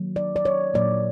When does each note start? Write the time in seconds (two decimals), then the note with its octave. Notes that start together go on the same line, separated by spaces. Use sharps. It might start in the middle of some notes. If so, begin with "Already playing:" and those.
Already playing: D#3 F#3 A#3
0.16 D5
0.36 D5
0.45 C#5
0.74 A#2 F#3 A#3 D5